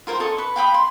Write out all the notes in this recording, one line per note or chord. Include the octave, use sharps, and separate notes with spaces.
F4 A#4 C5 G5
A4 D#5 C#6 D#6
B4 C#6
F5 G5 B5 D#6
C6